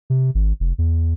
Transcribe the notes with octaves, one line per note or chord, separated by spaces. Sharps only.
C3
G#1
F1
E2